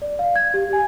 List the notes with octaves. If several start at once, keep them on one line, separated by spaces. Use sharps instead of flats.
D5
F5
G#6
G4
G#5